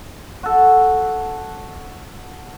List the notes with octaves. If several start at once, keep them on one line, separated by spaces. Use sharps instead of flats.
F#4 A4